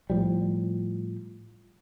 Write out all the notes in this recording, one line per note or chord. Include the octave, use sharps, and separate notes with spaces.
A2 F3 G3